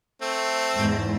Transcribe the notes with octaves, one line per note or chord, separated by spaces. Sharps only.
A3 C4
E2 G#2